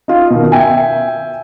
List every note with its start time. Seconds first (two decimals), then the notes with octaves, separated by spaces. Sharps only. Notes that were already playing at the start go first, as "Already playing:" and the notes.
0.08 D#4 F4
0.31 B2 D#3
0.52 E5 G5 G#5